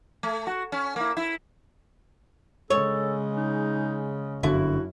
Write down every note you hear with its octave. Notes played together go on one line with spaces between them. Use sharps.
A3
F#4
C#4
A#3 E4
E4
C#3 G#3 A4 C#5
D#4
G1 F#2 D3 E4 F#4